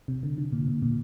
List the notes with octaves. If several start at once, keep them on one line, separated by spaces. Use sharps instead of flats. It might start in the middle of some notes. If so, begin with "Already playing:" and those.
C3
D3
D3
A#2
A#2
A#2